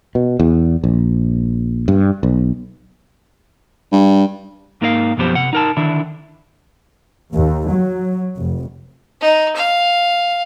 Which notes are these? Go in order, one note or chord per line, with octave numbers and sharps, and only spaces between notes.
B2
E2
A#1
G2
B1
G2
G#2 A#3 D#4 A#4 D#5 F5
B1 F#2 F3 B3 G4 C5
C3 F#5
D#4 A#4 A5
D3 D#3 D4 E4
D#2
F#3
F1
D#4
F5